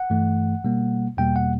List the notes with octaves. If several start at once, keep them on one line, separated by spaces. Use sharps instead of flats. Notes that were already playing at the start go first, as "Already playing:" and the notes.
Already playing: F#5
G2 E3 A3
B2 G3 A#3
E2 B2 G3 A#3 G5
F#5